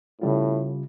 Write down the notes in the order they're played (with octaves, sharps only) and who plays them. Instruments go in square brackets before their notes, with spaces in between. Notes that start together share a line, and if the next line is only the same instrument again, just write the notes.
[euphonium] A2 [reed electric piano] C#3 G3 F4